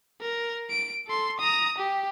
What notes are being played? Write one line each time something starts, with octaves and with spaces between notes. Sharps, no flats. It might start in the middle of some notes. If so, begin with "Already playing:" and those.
A#4
D7
A4 C6
A#5 D#6
G4